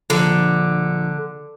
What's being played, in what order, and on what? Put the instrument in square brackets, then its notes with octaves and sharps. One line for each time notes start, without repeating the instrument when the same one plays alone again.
[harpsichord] A#1 [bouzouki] D3